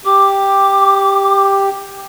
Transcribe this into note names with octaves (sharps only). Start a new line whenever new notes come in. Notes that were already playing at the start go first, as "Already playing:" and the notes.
G4 D6